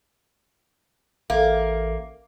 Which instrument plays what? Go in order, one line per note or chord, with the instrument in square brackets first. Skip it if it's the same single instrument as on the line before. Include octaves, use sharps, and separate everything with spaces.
[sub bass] A1 [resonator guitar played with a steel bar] A#3 [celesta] A4 E5